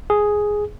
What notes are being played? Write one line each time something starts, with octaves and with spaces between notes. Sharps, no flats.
G#4